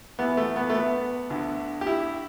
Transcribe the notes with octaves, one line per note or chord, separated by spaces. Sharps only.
E2 E3 B3
A3
B3
A3
B3
D2 D3
G4
E4